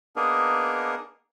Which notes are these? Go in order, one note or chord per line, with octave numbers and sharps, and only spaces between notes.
A#3 B3 D4 D#4 G#4 A#4